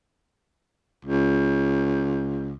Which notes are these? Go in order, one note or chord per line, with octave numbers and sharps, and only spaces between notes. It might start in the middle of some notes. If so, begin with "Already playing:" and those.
C#2